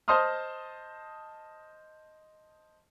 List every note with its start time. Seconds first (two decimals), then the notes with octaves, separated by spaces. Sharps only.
0.08 C5 D#5 A5 C6 D#6 F6